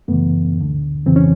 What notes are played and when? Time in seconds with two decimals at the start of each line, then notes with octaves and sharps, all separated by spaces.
0.08 F#2 C#3 E3 A3 B3
0.58 D2 D3
1.06 F2 C#3 E3 C4
1.16 C#4